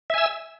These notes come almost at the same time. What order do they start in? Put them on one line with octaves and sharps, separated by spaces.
E5 G#5 E6